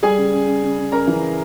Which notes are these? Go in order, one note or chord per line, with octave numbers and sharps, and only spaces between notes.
G3 G#4 G#5
C#3
C#3
C#3
C#3
C#3
C#3 A#4 A#5
E3
C#3